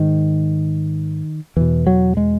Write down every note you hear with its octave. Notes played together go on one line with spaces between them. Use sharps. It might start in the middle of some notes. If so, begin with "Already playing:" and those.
Already playing: G#2 D#3
E2 B2 E3
F#3
G#3